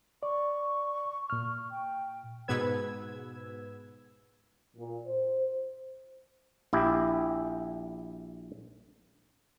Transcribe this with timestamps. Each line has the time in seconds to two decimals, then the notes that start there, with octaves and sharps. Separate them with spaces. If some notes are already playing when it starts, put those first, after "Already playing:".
0.23 D5 C#6
1.30 A#2 F6
1.71 G5
2.48 G#2 B2 B3 B4 E6 G#6
4.76 A#2
5.07 C5
6.73 A#1 E4 G4